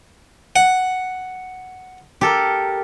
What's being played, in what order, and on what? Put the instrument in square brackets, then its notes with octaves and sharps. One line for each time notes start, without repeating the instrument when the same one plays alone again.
[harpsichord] F#5
[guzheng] G4 A4 A#4